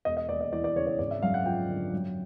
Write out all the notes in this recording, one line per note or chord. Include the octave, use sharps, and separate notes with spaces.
E1 D#5
D#5
D#2 D5
D#5
E3 D5
D5
C#3 C#5
C#5
G#1 D5
E5
F#2 F5
F#5
F3 G5
D3
F#2